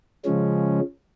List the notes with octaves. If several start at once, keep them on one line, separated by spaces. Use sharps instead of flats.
C#3 F3 G#3 C#4